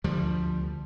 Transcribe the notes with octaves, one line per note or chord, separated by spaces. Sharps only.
D2 F3 G3